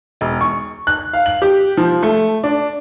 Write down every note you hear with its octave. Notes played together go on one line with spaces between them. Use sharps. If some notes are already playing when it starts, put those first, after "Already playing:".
E1
C#6
F#6
F5
F#7
G4
F3
A3
D4